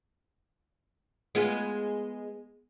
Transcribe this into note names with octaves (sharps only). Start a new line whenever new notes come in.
G#3 B3 F4